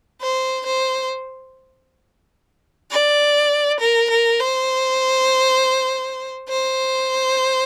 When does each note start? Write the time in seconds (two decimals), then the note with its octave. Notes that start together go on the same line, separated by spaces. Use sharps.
0.22 C5
0.66 C5
2.91 D5
3.80 A#4
4.10 A#4
4.40 C5
6.49 C5